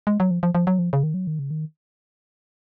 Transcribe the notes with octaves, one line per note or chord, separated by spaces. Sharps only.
G#3
F#3
F3
F3
F3
F#3
F3
C#3
D#3
F#3
D#3
C#3
D#3